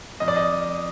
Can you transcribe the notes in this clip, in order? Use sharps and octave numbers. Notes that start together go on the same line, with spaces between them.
F2 D#5
D5
D#5